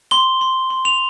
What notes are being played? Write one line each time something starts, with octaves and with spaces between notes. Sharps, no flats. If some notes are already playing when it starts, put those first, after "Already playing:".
C6 G7
C6
C6
F7